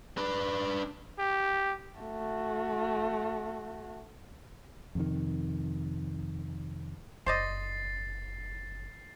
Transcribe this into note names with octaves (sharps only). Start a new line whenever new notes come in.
D4 B4
G4
A3 F#4
F2 C3 D#3
F#1 C5 D5 D#5 A6 C7